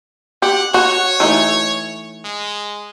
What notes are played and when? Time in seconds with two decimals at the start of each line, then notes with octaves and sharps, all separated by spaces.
0.42 G4 F#5
0.74 F#4 C#5
1.20 E3 A3 D#4
2.24 G#3